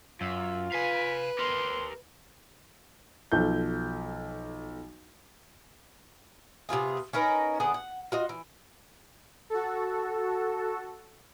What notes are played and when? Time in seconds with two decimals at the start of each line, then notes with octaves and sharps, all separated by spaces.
0.21 F#2 F4 E6
0.72 B4 F5 G#5 B6
1.39 G4 A#4 C6
3.32 B1 F3 A4 G6
6.69 C3 B3 F4 G#4
7.13 C#4 D#4 A#4 B4
7.60 D3 B3 G#4 F#5
7.74 F#5
8.12 F4 F#4 D#5
8.29 E3
9.50 F#4 A4